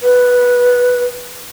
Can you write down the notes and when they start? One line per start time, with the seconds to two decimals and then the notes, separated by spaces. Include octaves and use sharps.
0.03 B4